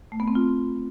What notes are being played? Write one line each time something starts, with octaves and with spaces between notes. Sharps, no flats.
A3
B3
C4
F4